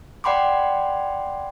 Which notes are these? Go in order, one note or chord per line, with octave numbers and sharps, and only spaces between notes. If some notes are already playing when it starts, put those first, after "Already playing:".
D5 F#5 G5 B5 C6 D6